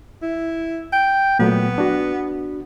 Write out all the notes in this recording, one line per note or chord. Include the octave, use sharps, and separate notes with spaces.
E4
G5
A#2 F#3 A3 B3
D4 F#4